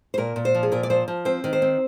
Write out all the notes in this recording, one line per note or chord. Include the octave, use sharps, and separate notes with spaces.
C5
A#2 A#4
A#2
C5
F3
G#4
A#2 A#4
D5
F3 C5
F3
C4 C5
D#3
C5
C4